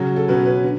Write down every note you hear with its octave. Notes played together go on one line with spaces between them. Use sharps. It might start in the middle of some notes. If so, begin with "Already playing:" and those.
Already playing: C#3 F#3 C#4 C#5
A4
B2 F#3 C#4 B4
B4
D3